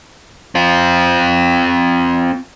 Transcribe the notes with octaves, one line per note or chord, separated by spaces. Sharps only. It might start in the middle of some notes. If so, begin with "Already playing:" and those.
C4 F4